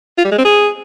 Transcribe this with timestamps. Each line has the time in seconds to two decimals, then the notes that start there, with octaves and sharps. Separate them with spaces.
0.18 F4
0.25 G3
0.32 G#3
0.38 C4
0.45 G#4